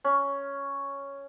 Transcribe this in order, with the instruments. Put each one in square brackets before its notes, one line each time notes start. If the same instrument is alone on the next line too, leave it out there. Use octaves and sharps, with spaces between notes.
[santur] C#4